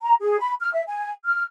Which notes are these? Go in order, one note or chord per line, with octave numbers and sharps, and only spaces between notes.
A#5
G#4
B5
F6
E5
G#5
F6